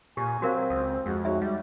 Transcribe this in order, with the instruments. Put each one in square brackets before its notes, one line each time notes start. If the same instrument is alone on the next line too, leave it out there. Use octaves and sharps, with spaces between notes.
[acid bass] A#2 [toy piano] G4 [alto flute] G#5
[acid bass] F#3 [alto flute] C4 [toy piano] F#4 A#4 F5
[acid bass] C#2 [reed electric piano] D#6
[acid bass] F2 [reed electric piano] G#3 F#4
[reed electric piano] G#3 D#4 C#5 [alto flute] F#4 [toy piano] E5
[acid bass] G3